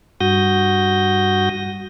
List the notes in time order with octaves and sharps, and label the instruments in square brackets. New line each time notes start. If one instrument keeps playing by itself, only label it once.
[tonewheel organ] G2 F#4 D#6 G6 A#6